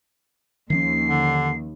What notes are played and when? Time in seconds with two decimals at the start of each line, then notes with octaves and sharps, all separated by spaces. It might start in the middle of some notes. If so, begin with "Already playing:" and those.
0.70 D#2 D#3 F3 C#4 C7
1.08 D3